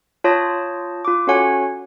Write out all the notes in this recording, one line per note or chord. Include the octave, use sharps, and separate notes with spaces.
F4 C#5 A5 D#6 G6 A#6
F4 D6
C#4 F#4 A4 C#5 F#5 G#5